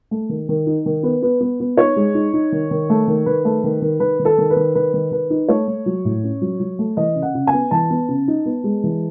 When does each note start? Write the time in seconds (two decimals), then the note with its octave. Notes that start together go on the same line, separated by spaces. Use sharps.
0.11 A3
0.29 D#3
0.49 D#3
0.66 D#4
0.86 D#3
1.03 B3 B4
1.22 B3
1.41 B3
1.60 B3
1.77 D#4 C#5
1.96 G#3
2.14 D#4
2.33 D#4
2.52 D#3
2.71 D#3
2.90 A3
3.08 D#3
3.26 D#3 B4
3.45 A3
3.64 D#3
3.82 D#3
4.00 D#3 B4
4.19 D#3
4.25 A4
4.38 D#3
4.50 B4
4.56 D#3
4.75 D#3 B4
4.94 D#3
5.11 D#3 B4
5.30 D#4
5.48 A3 C#5
5.68 A3
5.86 F#3
6.05 A2
6.24 C#4
6.42 F#3
6.60 F#3
6.79 A3
6.97 E3 D#5
7.15 C#3
7.22 F#5
7.35 C#3
7.47 G#5
7.53 B3
7.71 E3 A5
7.90 B3
8.09 C#3
8.28 D#4
8.46 B3
8.64 G#3
8.84 E3